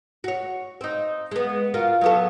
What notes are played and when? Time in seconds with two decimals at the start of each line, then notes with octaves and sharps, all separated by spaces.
0.24 F#4 C#5
0.81 C4 D#4
1.31 G#3 B3
1.74 F4 F#4 A#4
2.01 F#3 B3 A4